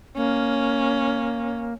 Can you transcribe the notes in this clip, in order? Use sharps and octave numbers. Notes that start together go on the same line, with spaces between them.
A#3 C#4